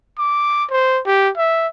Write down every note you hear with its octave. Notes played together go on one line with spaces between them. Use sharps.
D6
C5
G4
E5